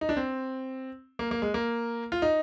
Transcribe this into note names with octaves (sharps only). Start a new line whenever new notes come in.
D#4
D4
C4
A#3
A#3
G#3
A#3
F4
D#4